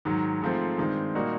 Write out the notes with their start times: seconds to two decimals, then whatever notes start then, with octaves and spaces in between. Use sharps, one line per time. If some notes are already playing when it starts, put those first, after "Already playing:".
0.05 G#2 D#3 F#3
0.42 G#2 F3 A3 C4
0.78 G2 D#3 G#3 C4
1.15 A#2 G3 A#3 D#4 F#4